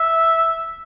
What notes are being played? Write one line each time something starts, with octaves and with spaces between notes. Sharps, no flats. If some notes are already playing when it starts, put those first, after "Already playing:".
Already playing: E5